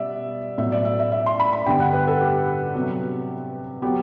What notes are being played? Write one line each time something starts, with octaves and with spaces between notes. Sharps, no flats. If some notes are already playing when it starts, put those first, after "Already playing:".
Already playing: B2 G3 B3 D5 E5
A2 F#3 B3 E5
D5
E5
E5
E5
C6
B5
B5
G2 D3 G3 B3 G5
F#5
B4
A4
G4
C3 F#3 B3
F#3 B3 G4